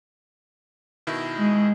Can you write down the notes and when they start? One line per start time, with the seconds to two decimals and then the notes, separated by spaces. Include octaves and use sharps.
1.07 B2 D#3 E4
1.39 G#3